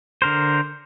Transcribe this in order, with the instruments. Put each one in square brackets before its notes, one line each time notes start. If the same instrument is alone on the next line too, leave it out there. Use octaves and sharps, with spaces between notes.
[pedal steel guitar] D3 A#4 C5